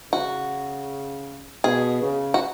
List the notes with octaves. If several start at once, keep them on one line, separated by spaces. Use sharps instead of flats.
C#3 F#4
B2 G#4
C#3
F#4